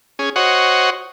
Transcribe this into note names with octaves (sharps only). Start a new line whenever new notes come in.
C#4 G#4
F#4 C5 C#5 D#5 F#5